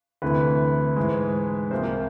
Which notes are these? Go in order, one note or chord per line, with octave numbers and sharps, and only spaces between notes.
D2 C3 E3 A3 B4
G#2 E3 G#3
C2 C3 F3 A#3 C5